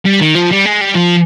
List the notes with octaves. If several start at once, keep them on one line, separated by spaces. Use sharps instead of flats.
G3
D#3
F3
G3
G#3
G3
F3